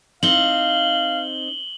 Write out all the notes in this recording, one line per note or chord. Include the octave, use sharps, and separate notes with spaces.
C4 D#4 F5 F#7 G7